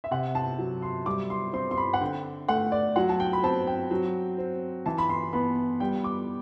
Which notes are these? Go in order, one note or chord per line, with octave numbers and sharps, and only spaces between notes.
E5
C3 F#5
A5
F#3
C6
G3 D6
C6
C4 C6
C6
B5
F#5
D3 G5
A3 F#5
D5
F#3 F#5
A5
G5
B5
C4 A5
G5
F#3
C4
E3 A5
B5
C6
B3 B5
G3 G5
D6